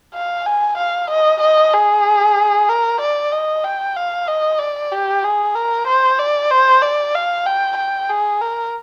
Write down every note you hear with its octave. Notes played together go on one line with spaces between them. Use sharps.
F5
G#5
F5
D#5
D#5
G#4
A#4
D5
D#5
G5
F5
D#5
D5
G4
G#4
A#4
C5
D5
C5
D5
F5
G5
G5
G#4
A#4